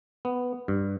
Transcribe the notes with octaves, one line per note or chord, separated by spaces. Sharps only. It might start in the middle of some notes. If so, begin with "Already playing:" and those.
B3
G2